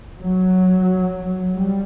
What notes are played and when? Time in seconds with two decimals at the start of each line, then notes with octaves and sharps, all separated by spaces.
0.21 F#3
1.54 G3